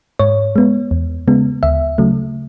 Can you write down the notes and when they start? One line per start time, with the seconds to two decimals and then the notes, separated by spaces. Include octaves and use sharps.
0.19 G#2 C#5
0.56 G#3 B3
0.91 E2
1.28 C#3 G#3 B3
1.63 D2 E5
1.98 C#3 F#3 A3